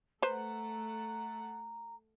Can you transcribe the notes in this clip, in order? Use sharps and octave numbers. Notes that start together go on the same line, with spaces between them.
A3 A4 B4 C5 F#5 A#5